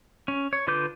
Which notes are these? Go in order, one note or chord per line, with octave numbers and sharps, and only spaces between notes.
C#4
C#5
D3 F4 B4 D6 G6